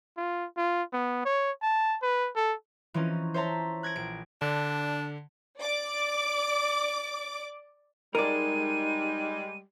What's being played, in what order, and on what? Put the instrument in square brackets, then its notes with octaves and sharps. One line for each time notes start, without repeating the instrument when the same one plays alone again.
[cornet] F4
F4
B3
C#5
A5
B4
A4
[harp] E3 F3 C4 C#4 D#4
C5 C#5 E5 A5 A#5 C6
F#6 G#6 A#6 D7
A#1 D7
[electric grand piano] D3 [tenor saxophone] D4
[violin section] D5 D6
[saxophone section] G3 G#3 [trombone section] D#4 [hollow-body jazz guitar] A#4 D5 [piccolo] D#7